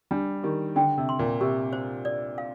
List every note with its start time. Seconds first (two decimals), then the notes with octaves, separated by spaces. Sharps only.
0.11 G3 D4
0.43 D#3 G4
0.76 D3 G5
0.98 C3
1.09 C6
1.19 A#2
1.41 C3 G4
1.73 C5
2.05 D5
2.38 F5